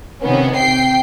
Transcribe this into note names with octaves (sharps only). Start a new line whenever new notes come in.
C3 D#3 B3 C#4
C3 G5 C7